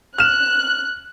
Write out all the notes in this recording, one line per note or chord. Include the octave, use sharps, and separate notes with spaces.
F6 F#6 E7